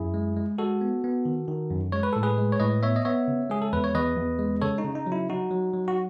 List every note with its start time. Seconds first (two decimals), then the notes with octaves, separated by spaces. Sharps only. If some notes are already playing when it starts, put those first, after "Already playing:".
Already playing: F#2 E4 G#4
0.14 G#3
0.36 G#3
0.58 G#3 F#4 A4
0.81 B3
1.04 B3
1.25 D#3
1.48 D#3
1.71 F#2
1.92 G#3 C#5
2.03 B4
2.13 A2 A4
2.23 G#4 B4
2.38 G#3
2.52 C#5
2.60 A2 B4 D#5
2.83 B3 C#5 E5
2.96 D#5
3.05 B3 C#5 E5
3.28 C#3
3.50 G#3 G#4
3.62 A4
3.73 E2 B4
3.84 C#5
3.95 E2 B4 D#5
4.16 E2
4.39 G#3
4.61 C#3 A4 C#5
4.78 D#4
4.84 C#3
4.95 D#4
5.06 F#3
5.12 E4
5.29 F#3 D#4 F#4
5.51 F#3
5.73 F#3
5.88 F#4